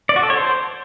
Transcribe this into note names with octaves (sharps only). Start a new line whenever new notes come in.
D5
F#4
A4
C#5
C5